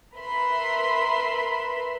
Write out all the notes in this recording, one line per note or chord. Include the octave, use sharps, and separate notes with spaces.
A#4 B4 E5 B5 C6